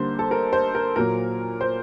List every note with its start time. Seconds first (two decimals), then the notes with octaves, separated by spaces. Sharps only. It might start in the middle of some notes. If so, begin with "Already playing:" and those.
Already playing: D3 G3 A#3 D#4 C5
0.19 A4
0.31 A#4
0.53 C5
0.75 A#4
0.96 A#2 F#3 A#3 A#4
1.61 C5